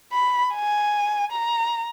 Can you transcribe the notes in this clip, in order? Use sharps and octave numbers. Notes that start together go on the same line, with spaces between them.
B5
G#5
A#5